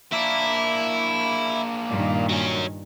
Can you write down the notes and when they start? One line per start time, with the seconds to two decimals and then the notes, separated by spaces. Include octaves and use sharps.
0.13 A#3 D4 E4
1.89 G2 A#2 D#3
2.29 F#3 C#4